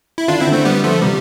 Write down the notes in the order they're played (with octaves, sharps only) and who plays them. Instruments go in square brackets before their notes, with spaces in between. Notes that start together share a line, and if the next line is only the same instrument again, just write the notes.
[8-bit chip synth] E4
[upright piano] D3 [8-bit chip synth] D4 F4
[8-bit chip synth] C4 E4
[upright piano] D3
[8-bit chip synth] A3 C4
G3 B3
F3 A3
[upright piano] C3 [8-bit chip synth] G3